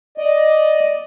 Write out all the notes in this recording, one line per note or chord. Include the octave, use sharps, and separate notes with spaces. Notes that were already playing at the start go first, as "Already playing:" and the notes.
D5 D#5